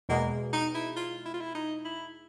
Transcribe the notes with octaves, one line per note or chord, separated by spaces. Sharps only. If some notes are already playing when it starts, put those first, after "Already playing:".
E2 B2 G#3 A#3
D#4
E4
F4
E4
F4
E4
D#4
E4